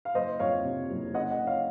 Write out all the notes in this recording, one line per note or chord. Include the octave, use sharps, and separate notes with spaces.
F5
F#1 C5 D#5
F2 C#5 F5
C3
F#1
C#3 D#5 F#5
D#5 F#5
C#3
C#5 F5